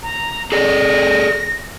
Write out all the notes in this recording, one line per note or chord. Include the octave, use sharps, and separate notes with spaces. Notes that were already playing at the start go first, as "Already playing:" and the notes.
A#5
G#4 A4 D5 A#6